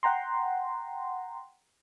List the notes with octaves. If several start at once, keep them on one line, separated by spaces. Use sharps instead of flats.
F#5 G5 A#5 C6